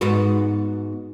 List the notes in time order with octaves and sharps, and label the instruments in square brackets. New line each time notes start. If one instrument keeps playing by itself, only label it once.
[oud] G#2 B3 F#4